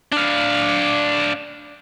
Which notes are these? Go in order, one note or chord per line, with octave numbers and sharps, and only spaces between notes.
D4 F5